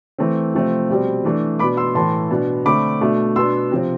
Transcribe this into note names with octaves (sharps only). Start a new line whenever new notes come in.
E3 A3 C4
C3 F3 A3 C4
B2 G3 C4
E3 A3 D4
B2 B3 D4 B5 D6
C6 E6
A2 E3 A3 A5 C6
B2 B3 D4
D3 A3 C4 B5 D6
B2 A3 D4
B2 B3 D4 C6 E6
C3 F3 C4